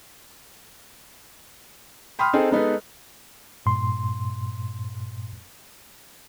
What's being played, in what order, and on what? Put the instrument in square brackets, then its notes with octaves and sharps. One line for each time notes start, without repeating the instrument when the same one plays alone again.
[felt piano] G5 B5 C6 D#6 F6
C4 D#4 G#4 A4
G#3 B3 D#4 A4 B4
[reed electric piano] G2 A#2 C6